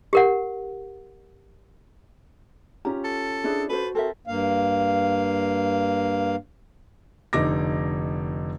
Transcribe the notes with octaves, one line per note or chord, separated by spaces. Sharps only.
G4 A#4 F#5
C#4 F4 G4 A#5
A4
D4 E4 G#4 C5
F#4 A4 B4 C5
C4 A4 A#4 E5
G2 A#3 F5
F1 D3 D#4 D6 A#6